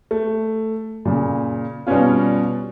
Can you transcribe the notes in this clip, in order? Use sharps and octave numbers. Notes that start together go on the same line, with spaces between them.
A3
A#2 C#3
B2 G3 B3 C#4 F4